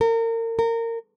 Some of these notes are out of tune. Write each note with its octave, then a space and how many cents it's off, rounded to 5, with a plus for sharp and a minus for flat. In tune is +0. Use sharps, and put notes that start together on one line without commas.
A#4 -35
A#4 -25